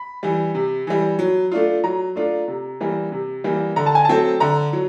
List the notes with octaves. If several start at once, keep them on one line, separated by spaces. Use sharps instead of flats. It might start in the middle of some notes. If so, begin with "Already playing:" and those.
Already playing: B5
E3 G3
C3
E3 G3
F#3
A3 D4 F4
F#3 A#5
A3 D4 F4
C3
E3 G3 A#3
C3
E3 G3 A#3
D3 A#5
A5
G#5
F#3 A3 C4 A5
D3 A#5
F#3